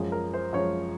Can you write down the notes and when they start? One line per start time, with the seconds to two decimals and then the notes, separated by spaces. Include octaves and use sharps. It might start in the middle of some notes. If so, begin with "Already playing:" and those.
Already playing: F#2 F3 G#3 G#4
0.12 A#4
0.34 C5
0.53 F#2 F3 G#3 C#5